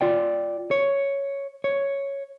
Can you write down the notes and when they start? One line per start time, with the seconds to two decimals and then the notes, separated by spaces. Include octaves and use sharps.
0.01 F4 D5 G5
0.71 C#5
1.64 C#5